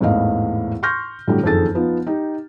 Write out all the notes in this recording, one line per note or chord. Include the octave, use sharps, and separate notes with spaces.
G#1 E2 A2 E3 D#5 F5
C6 C#6 F6 G6 A#6
A2 D3 F#3 G3
F#1 F2 D#3 G#4 A4 A6
F3 B3 D#4 F4
D#4 G4